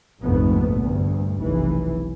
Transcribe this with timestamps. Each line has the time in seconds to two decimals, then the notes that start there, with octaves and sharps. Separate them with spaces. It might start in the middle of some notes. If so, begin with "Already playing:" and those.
0.20 F1 A#1 F2 G#2 A3 B3
0.76 D2 G2
1.41 F1 B1 E3